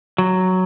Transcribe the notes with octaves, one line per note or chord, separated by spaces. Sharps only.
F#3